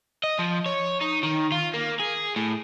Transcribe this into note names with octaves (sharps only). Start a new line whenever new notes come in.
D#5
F3
C#5
D#4
D#3
F4
A#3
G#4
A2